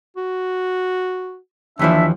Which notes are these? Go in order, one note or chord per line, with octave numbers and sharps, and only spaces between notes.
F#4
D#2 E3 F3 D4 E5